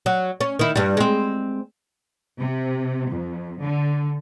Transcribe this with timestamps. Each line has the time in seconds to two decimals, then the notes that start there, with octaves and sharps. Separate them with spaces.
0.06 F#3
0.41 C#4
0.59 D#3 E4
0.76 G2 G3
0.97 G#3 C4
2.41 C3
3.11 F2
3.62 D3